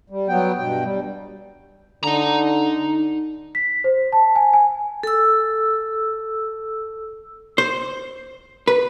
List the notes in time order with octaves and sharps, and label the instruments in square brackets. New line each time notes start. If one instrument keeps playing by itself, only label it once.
[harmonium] G3
F#3 B3 G5
G2 B2 G5
G3
[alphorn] D3 [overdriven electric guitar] D#4 A#5
[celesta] B6
C5
A5
G#5
G#5
[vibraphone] A4 E6
[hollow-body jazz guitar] C5
B4